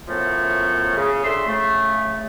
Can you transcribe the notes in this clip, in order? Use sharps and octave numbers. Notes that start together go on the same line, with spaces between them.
F#2 A2 F3 A3 B3 C#5
C#3
D2 E5 C6
C#3 A3